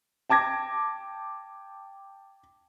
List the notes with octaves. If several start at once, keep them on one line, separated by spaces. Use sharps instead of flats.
G5 A5 D6 G#6 A#6